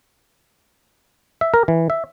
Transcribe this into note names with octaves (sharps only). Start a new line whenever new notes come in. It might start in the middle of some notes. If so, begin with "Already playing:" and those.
E5
A#4
E3
E5